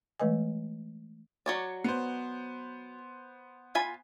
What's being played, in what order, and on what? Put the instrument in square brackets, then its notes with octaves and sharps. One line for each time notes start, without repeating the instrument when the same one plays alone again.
[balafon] E3 G#3 A3 B4 D#5 G#5
[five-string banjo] F#3 C#5 D5
[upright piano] B3 C5
[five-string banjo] F4 G#5 B5